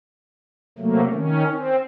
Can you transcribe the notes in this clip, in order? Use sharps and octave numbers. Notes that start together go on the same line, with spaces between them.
C3 F#3 A3 A#3
D#3 C#4
C4